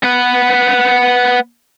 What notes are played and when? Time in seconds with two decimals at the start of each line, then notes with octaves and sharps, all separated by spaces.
0.03 B3 B4